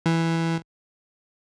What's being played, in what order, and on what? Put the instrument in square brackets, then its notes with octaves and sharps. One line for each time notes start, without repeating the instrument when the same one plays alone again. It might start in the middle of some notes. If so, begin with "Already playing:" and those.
[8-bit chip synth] E3